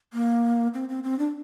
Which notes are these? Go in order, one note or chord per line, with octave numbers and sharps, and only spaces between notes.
A#3
C4
C4
C4
D4